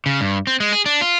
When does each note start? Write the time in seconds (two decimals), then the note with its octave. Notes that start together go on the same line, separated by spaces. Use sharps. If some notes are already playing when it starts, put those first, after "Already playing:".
0.06 C#3
0.21 G2
0.47 C4
0.60 G#3
0.73 G#4
0.86 D4
1.01 F4